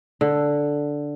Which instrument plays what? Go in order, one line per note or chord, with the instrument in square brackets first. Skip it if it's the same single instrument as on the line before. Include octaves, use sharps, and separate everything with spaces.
[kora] D3